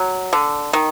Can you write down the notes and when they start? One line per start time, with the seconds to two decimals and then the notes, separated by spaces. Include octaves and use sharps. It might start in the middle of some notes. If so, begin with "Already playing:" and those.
Already playing: F#3
0.33 D3
0.73 D#3